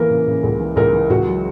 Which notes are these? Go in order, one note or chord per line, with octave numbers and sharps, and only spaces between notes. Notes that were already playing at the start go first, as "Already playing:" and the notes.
Already playing: E3 A#3 A#4
C#3
C#3
C#2
E3
C#2 A#4
E3
C#2 F#4
F#3